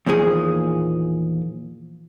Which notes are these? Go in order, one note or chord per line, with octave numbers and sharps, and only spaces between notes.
E2 A#2 D#3 F3 G#4